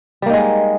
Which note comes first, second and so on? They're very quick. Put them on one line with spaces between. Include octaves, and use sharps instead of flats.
G3 A#3 D#4 G#3